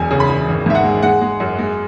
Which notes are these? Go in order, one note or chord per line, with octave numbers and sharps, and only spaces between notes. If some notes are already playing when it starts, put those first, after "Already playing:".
Already playing: E1 F#2 G#5
C#3
B5
E1
G#1
G#2 E5
F#5
G#3
G#3 F#5
G#3
F#2
G#3